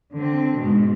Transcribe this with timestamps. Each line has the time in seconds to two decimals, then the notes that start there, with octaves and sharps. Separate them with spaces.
0.13 D3 C4
0.58 G#2 B2